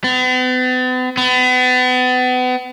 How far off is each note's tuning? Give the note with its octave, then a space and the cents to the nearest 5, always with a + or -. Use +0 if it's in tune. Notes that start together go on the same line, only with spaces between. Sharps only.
B3 +45
B3 +35